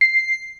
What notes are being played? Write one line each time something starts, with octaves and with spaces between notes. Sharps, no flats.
C7